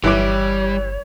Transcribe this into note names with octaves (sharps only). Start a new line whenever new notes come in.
G1 E3 G3 E4 C#5 D6